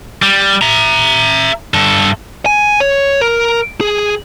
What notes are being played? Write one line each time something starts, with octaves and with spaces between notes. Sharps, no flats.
G3
E5 A#5
G2 A4
G#5
C#5
A#4
G#4